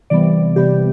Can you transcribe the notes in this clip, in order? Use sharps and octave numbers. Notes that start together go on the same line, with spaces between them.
C3 E3 G3 B3 D5
C3 E3 G3 B3 G4